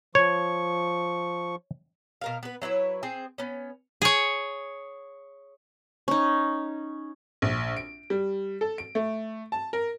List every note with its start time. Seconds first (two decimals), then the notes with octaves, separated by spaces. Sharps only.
0.15 F3 C#5 C#6
2.21 B2 A#4 F5
2.43 B3 B4
2.62 F#3 E4 B4 C#5
3.03 C4 G#4
3.38 B3 C#4
4.02 G#4 C#5
6.08 C#4 D#4
7.42 A#1
7.77 D7
8.10 G3
8.61 A4
8.78 D7
8.95 A3
9.52 A5
9.73 A#4